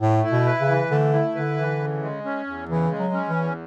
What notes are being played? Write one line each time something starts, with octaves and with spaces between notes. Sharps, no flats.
A2 A3
E4
B2
B4
C#3
E3
D3 A3
E4
D3 B4
E3
C#3
G#3
C#4
E2
C#3 E3
G#3
F#3
C#4
E3
E2